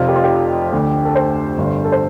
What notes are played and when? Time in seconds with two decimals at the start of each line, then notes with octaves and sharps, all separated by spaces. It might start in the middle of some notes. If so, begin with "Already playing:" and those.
Already playing: F1 F2 C3 F4
0.09 G4
0.16 F4
0.24 G4
0.72 D2 D3
1.05 A4
1.15 C5
1.58 G1 G2 D3
1.84 A4
1.92 C5